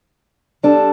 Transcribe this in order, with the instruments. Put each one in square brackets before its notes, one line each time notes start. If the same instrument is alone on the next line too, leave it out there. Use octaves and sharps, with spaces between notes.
[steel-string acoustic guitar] G3 D4 A4